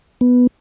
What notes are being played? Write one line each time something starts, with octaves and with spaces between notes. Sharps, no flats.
B3